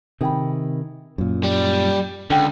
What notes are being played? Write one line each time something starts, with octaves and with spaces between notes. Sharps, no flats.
C3 D#3 G#4 G5 B5
F#2 A#2
G3
C#2 D3 D5 F#5 G5